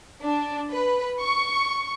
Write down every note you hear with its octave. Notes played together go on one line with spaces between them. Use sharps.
D4
B4
C#6